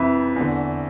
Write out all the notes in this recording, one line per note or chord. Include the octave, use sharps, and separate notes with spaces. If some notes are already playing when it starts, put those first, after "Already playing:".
Already playing: F2 C3 E3 B4 E5
E2 D3